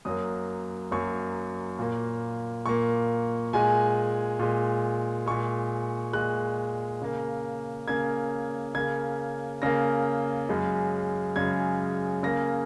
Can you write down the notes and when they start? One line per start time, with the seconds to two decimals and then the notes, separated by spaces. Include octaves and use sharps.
0.05 F#2 F#3 A#3 D#6
0.91 F#2 F#3 A#3 C#6
1.79 A#2 A#3
2.66 A#2 A#3 C#6
3.53 A#2 G#3 G#5
4.39 A#2 G#3
5.26 A#2 G#3 C#6
6.13 A#2 G#3 F#6
7.02 C#3 A#3
7.88 C#3 A#3 G#6
8.75 C#3 A#3 G#6
9.62 C#3 A#3 A#6
10.49 F#2 C#3 G#3
11.36 F#2 C#3 G#3 G#6
12.23 C#3 A#3 A#6